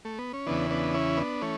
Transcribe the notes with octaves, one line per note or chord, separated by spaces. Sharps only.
A3
B3
C#4
E2 C#3 E3 B3 D4
B3 D4
C#4 E4
B3 D4
E3 A3 C#4